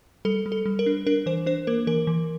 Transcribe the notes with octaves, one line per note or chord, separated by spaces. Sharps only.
G3 A4
G3
A4
G3
A#4
D4
D4 A#4
E3 C5
D4 C5
A#3 A#4
E3 A#4
E3